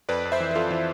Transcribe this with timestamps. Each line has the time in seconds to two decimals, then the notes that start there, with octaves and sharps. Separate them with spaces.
0.09 F2 B4 D5
0.25 F2
0.32 C5 E5
0.40 E3
0.51 B4
0.56 F2 F4 A4
0.71 E3